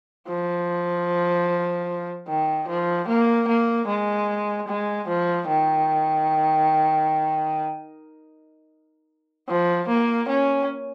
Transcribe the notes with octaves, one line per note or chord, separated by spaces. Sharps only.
F3
D#3
F3
A#3
A#3
G#3
G#3
F3
D#3
F3
A#3
C#4